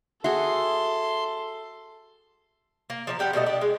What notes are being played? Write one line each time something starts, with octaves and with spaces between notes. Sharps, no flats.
F#4 G#4 A4 E5 C6
A#3
F3 D5 A#5
G3 G4 F5 F#5
B2 G3 A3 D#5
D4 G4
G#3